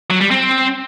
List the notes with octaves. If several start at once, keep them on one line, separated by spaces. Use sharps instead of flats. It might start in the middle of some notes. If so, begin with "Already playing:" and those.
F#3
G3
C4